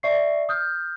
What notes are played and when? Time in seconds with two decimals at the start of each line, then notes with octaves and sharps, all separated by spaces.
0.03 D5 E5 C#6 C7
0.49 D#6 F6 G6